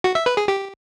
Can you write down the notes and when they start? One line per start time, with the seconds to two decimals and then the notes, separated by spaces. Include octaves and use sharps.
0.04 F#4
0.15 E5
0.26 B4
0.37 G#4
0.48 G4